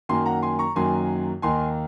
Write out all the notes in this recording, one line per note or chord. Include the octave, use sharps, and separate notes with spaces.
F#2 D#3 F#3 A#3 G#5 C6
F#5 A#5
G#5 C6
A#5 C#6
F#2 D#3 F#3 A#3 G#5 C6
D#2 D#3 A#3 D#4 G#5 C6